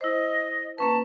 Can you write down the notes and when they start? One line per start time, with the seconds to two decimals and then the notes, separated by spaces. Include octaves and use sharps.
0.01 E4 C5 D#5
0.78 A#3 C#4 B4 A5